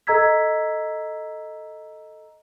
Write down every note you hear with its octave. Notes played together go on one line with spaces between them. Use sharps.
A4 D#5 A#5 E6 G#6 B6